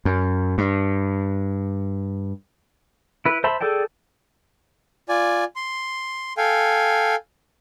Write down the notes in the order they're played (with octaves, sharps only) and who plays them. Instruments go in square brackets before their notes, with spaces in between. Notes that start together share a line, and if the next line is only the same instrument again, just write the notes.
[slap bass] F#2
G2
[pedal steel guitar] E4 B4
C5 E5 A5 B5 C6
G#4 A4 D5 G5 A5
[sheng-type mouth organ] F4 D5 G#5
C6
A4 F5 G5 G#5